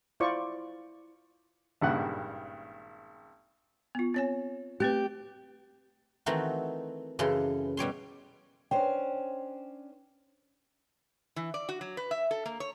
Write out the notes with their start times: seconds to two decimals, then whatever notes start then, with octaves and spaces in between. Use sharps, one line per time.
0.20 E4 F4 C5 D5 C#6
1.81 G#1 G2 A#2 C#3 F#5 F#6
3.95 B3 F4
4.14 C4 C#5 G#5
4.80 A3 C4 G4 B4
6.26 D#3 E3 A3 C4 D#4 F#4
7.19 F#2 C#3 E3 A4 C6
7.77 B2 G3 C#5 C6
8.71 C#4 D4 C5 G5
11.36 E3
11.54 D5
11.69 F#4
11.81 F#3
11.97 B4
12.11 E5
12.31 A4
12.46 A#3
12.60 C#5